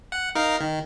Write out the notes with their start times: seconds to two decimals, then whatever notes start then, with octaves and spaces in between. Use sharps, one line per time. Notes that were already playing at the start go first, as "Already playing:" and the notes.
0.12 F#5
0.35 D#4 A#4 F5
0.60 D#3